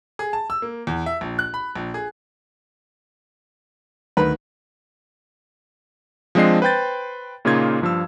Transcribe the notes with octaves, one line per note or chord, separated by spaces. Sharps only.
G#4
A5
E6
A#3
E2
E5
A#1
F#6
B5
A#1
G#4
D2 D#3 B4
F3 G#3 C4 D4 D#5 C7
B4 C5 G5 G6 A6
A#2 C#3 A#3 D#4 F4 G#6
G2 F3 F5 E6